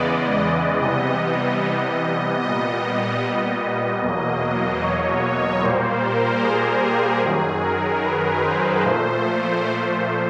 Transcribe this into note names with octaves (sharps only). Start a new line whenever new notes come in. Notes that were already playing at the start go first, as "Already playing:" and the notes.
Already playing: E2 C#3 E3 G#3 B3 D5 D#5
C3 E3 G3 B3 D#5
D#5
D#5
A#2 G3 B3 D#5
E2 B2 F#3 A#3 D#5
C#5
A#2 G3 A#3 C5
A#4
G#4
G4
F#2 D#3 F#3 G#4
A#4
B4
C5
A#2 F3 A3 C5